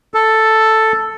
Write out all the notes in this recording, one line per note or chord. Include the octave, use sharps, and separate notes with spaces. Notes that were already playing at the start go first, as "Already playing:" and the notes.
A4